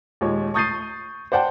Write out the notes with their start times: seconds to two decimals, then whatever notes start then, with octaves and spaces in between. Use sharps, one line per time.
0.21 D#2 A#2 G#3 C#5
0.54 C#6 D#6 G6 A6 C7 D#7
1.32 C5 D5 F#5 G5 A5